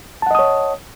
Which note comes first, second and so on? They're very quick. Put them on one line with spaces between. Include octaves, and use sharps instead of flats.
A5 F#5 D#5 D#6 C#5